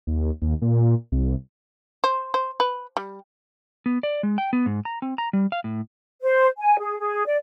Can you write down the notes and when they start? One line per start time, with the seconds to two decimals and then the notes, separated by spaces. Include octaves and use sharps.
0.07 D#2
0.42 D#2
0.62 A#2
1.12 C2
2.04 C5
2.34 C5
2.60 B4
2.97 G3
3.86 B3
4.03 D5
4.23 G#3
4.38 G5
4.53 B3
4.66 G#2
4.85 A#5
5.02 C4
5.18 A#5
5.33 G3
5.52 F5
5.64 A2
6.22 C5
6.57 G#5
6.79 G#4
6.99 G#4
7.26 D5